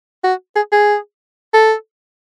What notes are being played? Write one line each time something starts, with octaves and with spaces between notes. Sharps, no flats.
F#4
G#4
G#4
A4